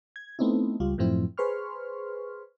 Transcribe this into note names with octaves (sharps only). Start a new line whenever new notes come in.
G#6
A3 B3 C4 D#4 E4
C#2 G3 F4
F#2 A2 F3 C4 E4
G#4 B4 C5 C6 C#6 F6